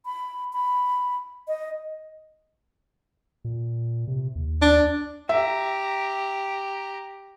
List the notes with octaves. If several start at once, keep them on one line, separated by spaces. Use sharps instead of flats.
B5
B5
D#5
A#2
C3
D#2
D4
G4 E5 A#5